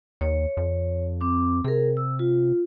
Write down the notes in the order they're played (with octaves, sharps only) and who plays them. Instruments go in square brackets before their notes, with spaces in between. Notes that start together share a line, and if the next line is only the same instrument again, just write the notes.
[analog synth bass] D#2 [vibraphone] C#5
[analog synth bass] F2
[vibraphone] C4 D6
[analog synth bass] C3 [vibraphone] G#4 A#4
[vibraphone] E6
F4